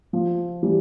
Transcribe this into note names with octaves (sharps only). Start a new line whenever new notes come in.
F3
E3 G3